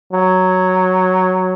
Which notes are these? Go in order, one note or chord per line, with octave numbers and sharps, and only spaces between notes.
F#3